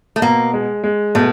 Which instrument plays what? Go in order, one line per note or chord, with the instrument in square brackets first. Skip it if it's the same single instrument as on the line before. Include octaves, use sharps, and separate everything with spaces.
[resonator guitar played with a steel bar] A3
[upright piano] B2 [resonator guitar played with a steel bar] A#3
[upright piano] G#3
G#3
[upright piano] B2 [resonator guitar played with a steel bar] A3